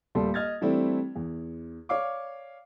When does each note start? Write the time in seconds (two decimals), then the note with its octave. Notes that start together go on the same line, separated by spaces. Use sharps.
0.15 D#1 G3 A3 A4 C6
0.34 D#5 F6 G#6 A6
0.61 E3 G3 A3 C4 D4 E4
1.15 E2
1.89 C#5 D5 F5 D6